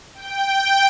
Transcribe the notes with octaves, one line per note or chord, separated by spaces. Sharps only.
G5